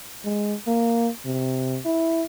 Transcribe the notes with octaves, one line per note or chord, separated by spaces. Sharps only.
G#3
A#3
C3
E4